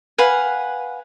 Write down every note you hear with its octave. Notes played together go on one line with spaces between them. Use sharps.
B4 F5 F#5 G#5